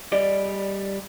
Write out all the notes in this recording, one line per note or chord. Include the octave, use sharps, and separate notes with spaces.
G3 D5 D#5